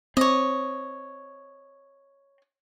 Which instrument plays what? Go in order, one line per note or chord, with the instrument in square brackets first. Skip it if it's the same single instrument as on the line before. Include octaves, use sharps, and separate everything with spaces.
[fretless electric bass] C4 [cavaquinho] C#5 D#5